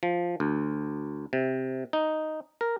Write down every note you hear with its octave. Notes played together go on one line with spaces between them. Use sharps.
F3
D2
C3
D#4
A#4